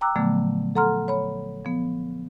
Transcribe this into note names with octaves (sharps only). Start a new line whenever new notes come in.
G5 A#5 D6 E6 F#6
A#2 D3 F3 F#3 A3 B3
A4 F#5 A#5 C6 F6
C#5 B5
F3 B3